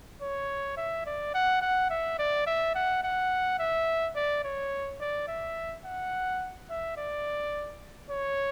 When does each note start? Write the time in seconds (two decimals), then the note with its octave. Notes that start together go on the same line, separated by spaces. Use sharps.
0.21 C#5
0.77 E5
1.06 D5
1.34 F#5
1.61 F#5
1.90 E5
2.19 D5
2.47 E5
2.75 F#5
3.03 F#5
3.59 E5
4.15 D5
4.44 C#5
5.00 D5
5.28 E5
5.85 F#5
6.70 E5
6.97 D5
8.10 C#5